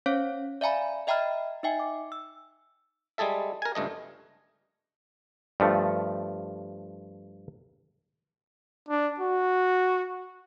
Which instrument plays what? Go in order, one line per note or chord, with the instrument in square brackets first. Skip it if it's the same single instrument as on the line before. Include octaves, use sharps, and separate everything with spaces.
[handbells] C#4 C5 C#5 F5
D5 E5 F5 G#5 A#5 B5
D#5 E5 G5 A#5 B5 F6
D#4 D#5 E5 G5 G#5
D6
E6
[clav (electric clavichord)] G3 G#3 G#4 A4 E5
A#4 G#5
C#2 G2 A3 D#5
G2 F3 A3
[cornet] D4
F#4